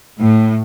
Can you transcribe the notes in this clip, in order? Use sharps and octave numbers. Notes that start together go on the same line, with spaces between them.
A2